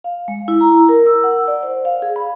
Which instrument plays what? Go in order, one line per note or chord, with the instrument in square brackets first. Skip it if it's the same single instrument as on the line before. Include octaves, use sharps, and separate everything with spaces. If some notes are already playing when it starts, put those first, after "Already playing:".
[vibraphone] F5
G#3
E4
A#5
A#4
E6
F#5
D5
C5
F5
G#4
B5